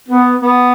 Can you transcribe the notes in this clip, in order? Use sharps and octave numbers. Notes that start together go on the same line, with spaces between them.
B3
B3